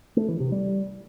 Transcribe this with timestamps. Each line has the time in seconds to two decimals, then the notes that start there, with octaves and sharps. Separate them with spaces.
0.17 A3
0.28 E3
0.40 C3
0.52 G3